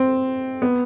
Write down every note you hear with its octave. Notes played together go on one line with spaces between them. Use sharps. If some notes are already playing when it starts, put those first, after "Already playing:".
Already playing: C4
B3